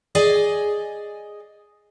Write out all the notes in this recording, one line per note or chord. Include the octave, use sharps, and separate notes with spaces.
G#4 D5 D#5 G#5